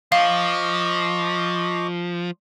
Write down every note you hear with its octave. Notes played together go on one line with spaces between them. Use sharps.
F3 D#5 F5 C#6 D6